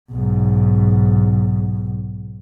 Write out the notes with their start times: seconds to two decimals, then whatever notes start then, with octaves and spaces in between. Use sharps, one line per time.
0.11 B1 G#2